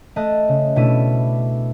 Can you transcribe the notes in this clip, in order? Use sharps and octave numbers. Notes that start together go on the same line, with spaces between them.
A3 D#5 A5 F#6
C#3
B2 A3 D4 E4 D#7